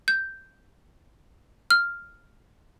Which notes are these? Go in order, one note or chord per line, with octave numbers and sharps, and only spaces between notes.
G6
F6